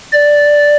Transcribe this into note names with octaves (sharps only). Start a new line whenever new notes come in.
D5